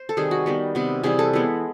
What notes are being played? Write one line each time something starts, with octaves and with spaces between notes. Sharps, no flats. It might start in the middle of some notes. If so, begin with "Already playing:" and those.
Already playing: C5
A4
C3 D#3 G3 G#4
F#4
D#3 G3 B3
C3 D#3 G3 B3
C3 E3 G3 G#4
A4
E3 G#3 B3